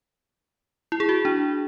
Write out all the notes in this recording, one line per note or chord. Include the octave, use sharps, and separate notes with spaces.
E4
G#4
F#4
D4